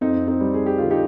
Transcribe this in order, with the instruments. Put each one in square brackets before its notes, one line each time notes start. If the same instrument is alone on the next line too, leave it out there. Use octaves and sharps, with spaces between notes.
[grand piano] F2 C4 D#4
C4 D#4
G3
G#4
G4
D3 F4
D#4 G4